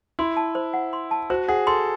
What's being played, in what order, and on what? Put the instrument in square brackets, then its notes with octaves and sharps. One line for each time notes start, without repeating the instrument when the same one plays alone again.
[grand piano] E4 [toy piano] C6
[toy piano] A5
C5
F#5
C6
A5
[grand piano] F#4 [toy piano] C5
[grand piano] G#4 [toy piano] F#5
[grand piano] A4 [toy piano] C6